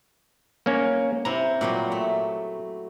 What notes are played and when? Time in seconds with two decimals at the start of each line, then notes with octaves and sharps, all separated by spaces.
0.66 A#3 C#4
1.25 C3 E4 A#5
1.61 A#2 F#3 G3
1.92 A3